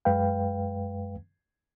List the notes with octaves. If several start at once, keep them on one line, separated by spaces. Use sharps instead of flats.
F#2 G#3 B4 F5 G5